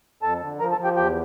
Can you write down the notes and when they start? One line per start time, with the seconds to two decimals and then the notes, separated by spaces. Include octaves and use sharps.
0.23 F2 A4 A5
0.41 D3
0.60 F3 A#4 A#5
0.72 A4 A5
0.78 F3
0.84 G4 G5
0.97 E2 G4 G5